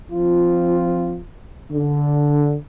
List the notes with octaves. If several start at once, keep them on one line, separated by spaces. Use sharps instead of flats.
F3 C4 F4
D3